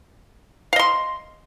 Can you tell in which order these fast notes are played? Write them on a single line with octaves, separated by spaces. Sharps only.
F5 D#5 C6